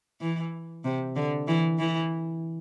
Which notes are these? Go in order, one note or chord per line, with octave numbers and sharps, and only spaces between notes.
E3
C3
D3
E3
E3